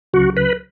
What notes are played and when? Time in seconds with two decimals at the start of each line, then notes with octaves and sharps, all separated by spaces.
0.13 C#2 C#3 F#3 F#4
0.37 B4